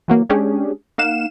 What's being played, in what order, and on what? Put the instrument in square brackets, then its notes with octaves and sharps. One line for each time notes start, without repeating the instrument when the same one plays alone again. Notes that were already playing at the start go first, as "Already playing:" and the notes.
[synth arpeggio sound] E3 F#3 A#3
G#3 C#4 D4 G4 G#4
A#3 D#4 F5 F#5 E7